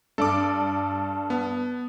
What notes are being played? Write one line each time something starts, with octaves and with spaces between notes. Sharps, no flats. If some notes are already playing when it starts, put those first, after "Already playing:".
G2 A4 D5 D6
B3